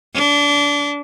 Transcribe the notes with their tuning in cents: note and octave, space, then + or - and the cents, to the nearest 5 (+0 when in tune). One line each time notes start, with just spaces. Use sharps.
D4 -25